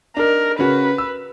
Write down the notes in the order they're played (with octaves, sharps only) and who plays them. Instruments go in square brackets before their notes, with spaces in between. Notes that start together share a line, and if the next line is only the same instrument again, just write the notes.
[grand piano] D4 D#4 [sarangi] A#4
[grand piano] C#3 C#4 F#4 [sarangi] B4
[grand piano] E6